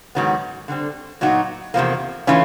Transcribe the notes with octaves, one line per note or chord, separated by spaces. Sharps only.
G#2 D#3 F#3 B3
D3 G3 C4
A#2 F#3 B3 D#4 F#4
E2 C3 F3 A#3
E3 A3 C#4 F4